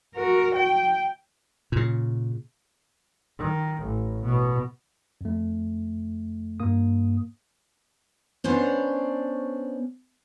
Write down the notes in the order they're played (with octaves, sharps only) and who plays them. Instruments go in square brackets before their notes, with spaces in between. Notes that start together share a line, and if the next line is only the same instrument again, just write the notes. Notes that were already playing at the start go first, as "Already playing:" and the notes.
[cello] F#4 A#4
G5
[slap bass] A#2 C#3
[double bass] D#3
A1
B2
[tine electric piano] F2 A3
G2 A#3 D#6
[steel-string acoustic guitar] B3 C#4 D4 C5 C#5